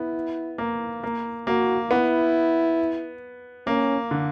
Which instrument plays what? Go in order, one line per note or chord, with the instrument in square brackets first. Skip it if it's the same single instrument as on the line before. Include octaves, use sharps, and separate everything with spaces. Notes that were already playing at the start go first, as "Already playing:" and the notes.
Already playing: [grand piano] B3 [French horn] E4
[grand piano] A#3
A#3
[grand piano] A#3 [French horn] F#4
[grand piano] B3 [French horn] E4
[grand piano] A#3 [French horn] C#4
[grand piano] D3